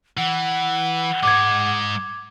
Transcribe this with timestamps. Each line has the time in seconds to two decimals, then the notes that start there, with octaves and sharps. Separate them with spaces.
0.17 E3 F#5
1.23 G#2 G#3 D6 G#6